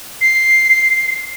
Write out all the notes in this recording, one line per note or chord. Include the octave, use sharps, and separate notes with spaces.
C7